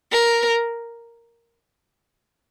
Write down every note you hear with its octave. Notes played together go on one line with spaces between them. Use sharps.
A#4